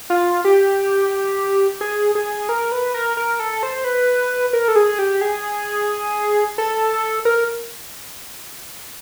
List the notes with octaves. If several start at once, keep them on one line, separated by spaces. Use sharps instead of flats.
F4
G4
G#4
G#4
A#4
B4
A#4
A#4
A4
C5
B4
A#4
A4
G#4
G4
G#4
A4
A#4